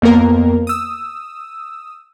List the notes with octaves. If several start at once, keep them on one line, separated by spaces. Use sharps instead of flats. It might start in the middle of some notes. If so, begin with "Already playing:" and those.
F2 A#3 B3 A#4 A#5
D#6 E6